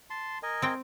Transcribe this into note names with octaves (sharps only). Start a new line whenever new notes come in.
A5 C6
A#4 D#5 G#5
C4 G5